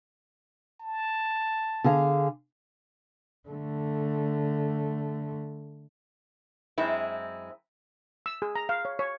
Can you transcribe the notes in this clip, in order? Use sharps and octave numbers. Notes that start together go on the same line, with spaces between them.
A5
D3 G#4 F5
D3 A3
F#2 G#3 C4 E4
E6
G#4
A#5
F5
C#5
C#5